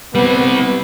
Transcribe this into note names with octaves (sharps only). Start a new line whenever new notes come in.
G3 B3 C4